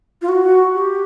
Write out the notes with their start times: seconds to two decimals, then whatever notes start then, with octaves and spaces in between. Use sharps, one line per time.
0.22 F4
0.29 F#4
0.74 G4